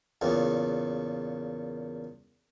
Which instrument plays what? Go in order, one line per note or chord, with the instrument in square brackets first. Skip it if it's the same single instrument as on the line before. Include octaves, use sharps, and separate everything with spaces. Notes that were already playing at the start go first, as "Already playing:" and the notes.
[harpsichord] E2 A#2 C#3